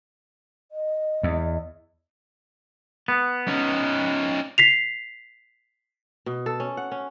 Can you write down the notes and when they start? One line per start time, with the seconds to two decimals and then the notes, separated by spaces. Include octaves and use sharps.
0.72 D#5
1.23 E2
3.08 B3
3.48 C#4 D#4
4.58 B6 C7 F7
6.26 B2
6.46 A4
6.60 C#4
6.77 F#5
6.92 C#4